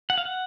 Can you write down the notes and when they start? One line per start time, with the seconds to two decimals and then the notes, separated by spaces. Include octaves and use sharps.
0.10 F#5
0.18 F5
0.25 F#5